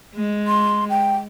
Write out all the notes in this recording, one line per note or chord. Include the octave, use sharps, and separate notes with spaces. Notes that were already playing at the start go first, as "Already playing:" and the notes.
G#3
C6
G5